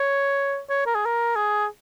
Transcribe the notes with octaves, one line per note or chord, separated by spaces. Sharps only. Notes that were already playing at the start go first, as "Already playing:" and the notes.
Already playing: C#5
C#5
A#4
G#4
A#4
G#4